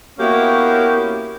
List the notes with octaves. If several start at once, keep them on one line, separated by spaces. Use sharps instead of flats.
A#3 B3 C#4 E4 F#4 G4